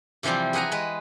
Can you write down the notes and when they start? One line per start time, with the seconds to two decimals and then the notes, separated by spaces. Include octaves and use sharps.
0.23 C3 E3 F3 G3 C4
0.53 G#4 B4 F#5 G#5 A#5
0.72 G#3 B4